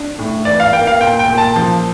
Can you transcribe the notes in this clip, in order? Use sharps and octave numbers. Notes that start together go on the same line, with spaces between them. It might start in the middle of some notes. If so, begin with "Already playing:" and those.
Already playing: D4
A2
E3 D5
F5
A#3 G5
F5
A#2 G5
G5
A#2
A5
F3